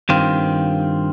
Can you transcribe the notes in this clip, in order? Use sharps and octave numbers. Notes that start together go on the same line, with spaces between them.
G2 D#3 C4 F4